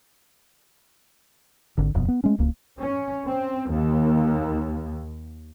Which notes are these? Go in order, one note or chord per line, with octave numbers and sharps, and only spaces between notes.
G#1 D3
D#1 F2 B2
B3
G#3 A3 C#4
D1 C#2 A#3
C#4
C4
D#2